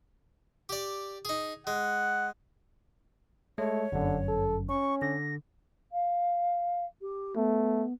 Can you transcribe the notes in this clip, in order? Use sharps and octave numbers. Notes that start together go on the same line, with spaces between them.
G4 D5
D#4 G#4
G#3 F#5
G#3 A3 C#5
G1 F#2 D3
A4
C#4 C#6
D3 A#6
F5
G4
A3 B3